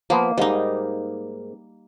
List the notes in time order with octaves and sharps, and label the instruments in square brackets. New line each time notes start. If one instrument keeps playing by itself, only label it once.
[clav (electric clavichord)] F3 B3 [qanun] A#3
[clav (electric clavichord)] G#2 A#3 [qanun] G3 D#4